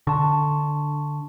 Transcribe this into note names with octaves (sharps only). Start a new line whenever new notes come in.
D3 A5 C6 C#6